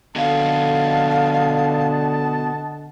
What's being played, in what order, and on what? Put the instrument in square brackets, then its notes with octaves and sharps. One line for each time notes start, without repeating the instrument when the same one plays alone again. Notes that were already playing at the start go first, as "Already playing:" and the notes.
[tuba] D3 [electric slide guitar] B3 F#4 A4 [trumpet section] D#5 F#5 A5 [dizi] F5